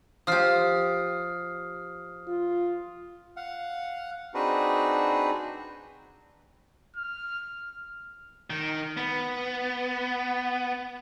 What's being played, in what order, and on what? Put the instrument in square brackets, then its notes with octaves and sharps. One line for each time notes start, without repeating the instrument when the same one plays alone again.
[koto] F3 G4 [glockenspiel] D#6 F6 C7
[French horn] F4
[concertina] F5 F#5
C4 D4 D#4 F#4 G#4 B4
[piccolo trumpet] F6
[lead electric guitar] D#3
B3